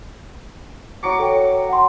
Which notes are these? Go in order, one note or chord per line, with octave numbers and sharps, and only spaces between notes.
F#3 C#6 D6
A4 C#5 G5
F#5 C6